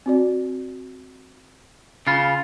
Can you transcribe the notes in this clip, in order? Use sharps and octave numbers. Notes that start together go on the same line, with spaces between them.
C4 F#4 D5
C#3 F4 B5